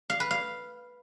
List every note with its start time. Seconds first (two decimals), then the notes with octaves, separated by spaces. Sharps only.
0.10 F5
0.20 B4
0.31 F5